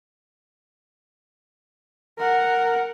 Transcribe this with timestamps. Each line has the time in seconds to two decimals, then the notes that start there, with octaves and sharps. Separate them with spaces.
2.19 A#4 F#5